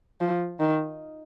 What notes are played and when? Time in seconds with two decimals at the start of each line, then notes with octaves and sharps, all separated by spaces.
0.21 F3
0.60 D#3